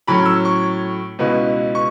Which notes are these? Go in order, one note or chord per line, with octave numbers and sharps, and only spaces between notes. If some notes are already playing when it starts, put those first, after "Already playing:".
A2 F#3 C#4 B5
E6
C#6
C#2 B2 B3 E4
C#6